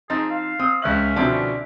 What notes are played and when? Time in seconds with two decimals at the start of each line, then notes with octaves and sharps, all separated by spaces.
0.10 F3 C4 D#4 G#4 A6
0.30 F5
0.59 C4 D#6
0.82 C#2 C#4 E5 F#6 F#7
1.16 B2 D3 F3 C4 E4 D5